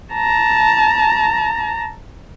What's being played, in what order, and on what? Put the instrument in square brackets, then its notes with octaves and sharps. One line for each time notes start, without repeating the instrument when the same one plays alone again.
[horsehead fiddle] A5 A#5